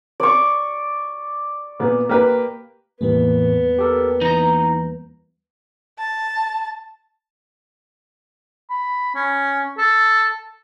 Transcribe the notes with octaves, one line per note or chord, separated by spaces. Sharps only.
D5 C#6
A#2 B3
A#3 G4 B4
E2 A2 D#3 E3 G3 A#3 B3
G4 A4 A#4
E3 D#4 A#5
A5
B5
C#4
A4